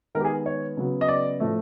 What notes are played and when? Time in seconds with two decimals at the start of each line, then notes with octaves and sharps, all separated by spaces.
0.15 D#3 G#3 B3 A#4
0.20 G4
0.25 G#4
0.46 C#5
0.77 C#3 F#3 B3
1.01 D#5
1.08 D5
1.40 A2 F3 A3